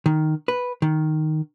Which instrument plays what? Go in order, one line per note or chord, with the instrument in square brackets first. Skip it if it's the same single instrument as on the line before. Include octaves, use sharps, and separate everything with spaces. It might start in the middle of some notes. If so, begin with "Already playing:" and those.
[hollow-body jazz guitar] D#3
B4
D#3